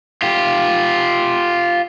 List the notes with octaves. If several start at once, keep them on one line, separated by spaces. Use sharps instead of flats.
F4 G4